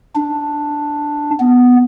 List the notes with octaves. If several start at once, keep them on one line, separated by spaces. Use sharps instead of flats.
D4
B3